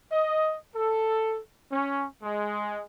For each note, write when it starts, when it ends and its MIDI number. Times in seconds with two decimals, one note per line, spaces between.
0.10 0.54 75
0.76 1.39 69
1.72 2.04 61
2.22 2.82 56